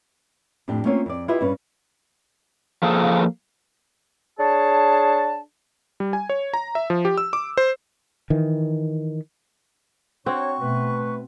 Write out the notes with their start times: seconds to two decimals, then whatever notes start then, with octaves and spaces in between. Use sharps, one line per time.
0.68 F2 A2 D4 G4
0.84 A3 A#3 C4 C#4 F4 C#5
1.06 F2 D5
1.28 E4 F4 G4 B4 D#5 E5
1.41 G2 C#4 B4
2.83 F3 A#3 G#4 A4
4.39 D4 G#4 C#5 A5
6.00 G3
6.13 G#5
6.29 C#5
6.54 A#5
6.75 E5
6.90 F3
7.05 G4
7.18 E6
7.33 D6
7.57 C5
8.30 D#3 E3
10.26 C4 D4 F#4 C#5 C#6
10.60 B2 A3 B4